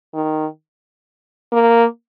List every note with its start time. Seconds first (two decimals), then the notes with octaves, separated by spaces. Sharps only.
0.14 D#3
1.52 A#3